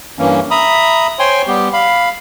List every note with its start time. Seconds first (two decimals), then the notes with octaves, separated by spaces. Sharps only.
0.19 G2 E3 A#3 C#4
0.51 E5 A#5 B5 D#6
1.19 C5 C#5 G5 G#5 C6
1.47 G3 B3 G4
1.73 F5 B5